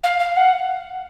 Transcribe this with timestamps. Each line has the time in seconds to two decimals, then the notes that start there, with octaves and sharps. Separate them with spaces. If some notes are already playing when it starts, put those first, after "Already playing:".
0.03 F5
0.19 F5
0.37 F#5